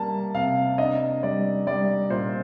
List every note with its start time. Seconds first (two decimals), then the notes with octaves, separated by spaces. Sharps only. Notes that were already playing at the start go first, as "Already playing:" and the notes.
Already playing: G3 A#3 A5
0.34 C3 F5
0.78 D4 D#5
1.23 G3 D5
1.67 G3 D5
2.10 A#2 C5